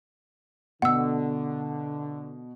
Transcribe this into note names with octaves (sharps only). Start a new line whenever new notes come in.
B2 D3 F#5 E6